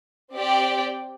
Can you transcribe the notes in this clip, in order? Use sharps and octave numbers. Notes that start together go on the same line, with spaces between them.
C4 G4 D5 G5